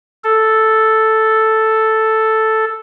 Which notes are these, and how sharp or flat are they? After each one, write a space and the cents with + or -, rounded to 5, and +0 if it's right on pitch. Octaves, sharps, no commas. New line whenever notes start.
A4 +0